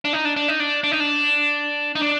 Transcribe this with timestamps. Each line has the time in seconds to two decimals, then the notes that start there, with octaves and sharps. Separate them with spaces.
0.05 D4
0.13 D#4
0.25 D4
0.36 D4
0.48 D#4
0.60 D4
0.84 D4
0.92 D#4
1.00 D4
1.95 D#4
2.01 D4